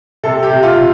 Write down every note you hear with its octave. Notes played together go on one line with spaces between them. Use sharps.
C3 A4
G4
C3
F4
C3